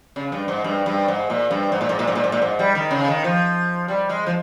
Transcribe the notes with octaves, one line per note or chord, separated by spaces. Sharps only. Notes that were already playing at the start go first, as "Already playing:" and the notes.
C#3
G2
G#2
G2
G2
G#2
A#2
G2
G#2
A#2
G#2
A#2
G#2
A#2
G#2
A#2
G#2
G3
D#3
C#3
D#3
F3
G3
G#3
F3